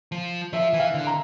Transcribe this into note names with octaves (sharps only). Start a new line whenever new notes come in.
F3
F3 E5
E3
F5
D3
A#5